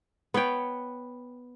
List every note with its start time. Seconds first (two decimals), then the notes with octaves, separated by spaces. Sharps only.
0.34 B3 B4 C#5 G5